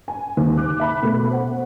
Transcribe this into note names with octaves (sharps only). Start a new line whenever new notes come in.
G#5
D#2
D6 F#6
E5 B5 F#6
B2 A3
C5 F#5